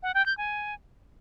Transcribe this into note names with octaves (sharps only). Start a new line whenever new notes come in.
F#5
G5
G6
G#5